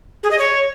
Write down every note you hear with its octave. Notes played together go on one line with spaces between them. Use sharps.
G#4
D#5
C#5